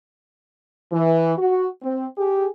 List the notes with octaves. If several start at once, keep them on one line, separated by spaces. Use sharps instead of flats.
E3
F#4
C4
G4 G#4